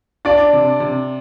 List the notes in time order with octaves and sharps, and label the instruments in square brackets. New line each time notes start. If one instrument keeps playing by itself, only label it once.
[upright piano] D4 [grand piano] D5
[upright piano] C3
C3